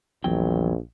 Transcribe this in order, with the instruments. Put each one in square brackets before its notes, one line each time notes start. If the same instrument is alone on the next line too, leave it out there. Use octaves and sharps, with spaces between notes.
[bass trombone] A#1 [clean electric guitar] E2 F#3 G5